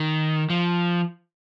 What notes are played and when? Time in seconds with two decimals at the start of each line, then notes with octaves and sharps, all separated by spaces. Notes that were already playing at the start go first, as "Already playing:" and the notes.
Already playing: D#3
0.50 F3